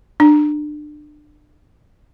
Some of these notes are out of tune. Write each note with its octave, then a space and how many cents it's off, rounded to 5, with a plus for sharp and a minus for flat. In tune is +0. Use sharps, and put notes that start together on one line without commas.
D4 +30